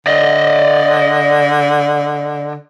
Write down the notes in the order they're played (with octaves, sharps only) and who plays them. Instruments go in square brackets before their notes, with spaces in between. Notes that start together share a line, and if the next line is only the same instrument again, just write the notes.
[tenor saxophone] D3 [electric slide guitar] D5 D#5